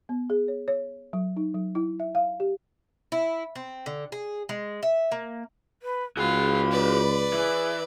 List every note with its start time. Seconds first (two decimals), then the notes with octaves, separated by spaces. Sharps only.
0.09 B3
0.30 G#4
0.48 C#5
0.68 C#5
1.13 F#3
1.37 D#4
1.54 F#3
1.75 E4
2.00 E5
2.15 F5
2.40 G4
3.12 E4
3.55 C4
3.86 D3
4.12 G#4
4.49 G#3
4.83 E5
5.12 A#3
5.82 B4
6.17 C#2 F4 F#4 G#4 B5
6.71 B4 D5
7.33 E3 G#4